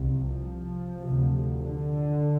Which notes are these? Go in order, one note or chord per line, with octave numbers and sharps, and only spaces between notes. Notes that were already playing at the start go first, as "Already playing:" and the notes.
Already playing: C2 C3
F3
C3
D2
D3